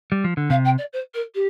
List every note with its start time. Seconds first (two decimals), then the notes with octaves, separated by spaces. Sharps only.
0.12 G3
0.24 F3
0.37 D3
0.50 C3 F5
0.65 G5
0.78 D5
0.93 C5
1.14 A#4
1.34 G4